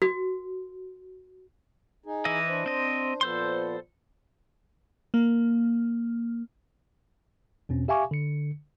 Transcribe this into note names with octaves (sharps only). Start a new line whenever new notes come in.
F#4
D#4 G#4
E3 E4 D#5
D4 C5
C4 D#5
A#2 F3 B3 A4 C5 C6
A#3
E2 B2 C4 C#4
G4 E5 F5 G#5 C#6 D6
D3 C#7